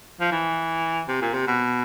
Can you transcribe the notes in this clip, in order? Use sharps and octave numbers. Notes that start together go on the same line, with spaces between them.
F3
E3
C3
A#2
C3
B2